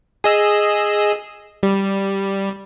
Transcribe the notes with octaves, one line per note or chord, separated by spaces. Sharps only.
G#4 D#5 E6
G3